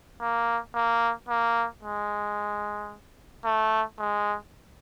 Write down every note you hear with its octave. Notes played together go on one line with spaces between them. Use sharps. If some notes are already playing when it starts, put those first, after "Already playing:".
A#3
A#3
A#3
G#3
A3
G#3